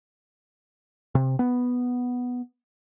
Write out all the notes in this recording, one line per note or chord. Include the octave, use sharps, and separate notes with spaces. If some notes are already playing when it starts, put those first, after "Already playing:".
C3
B3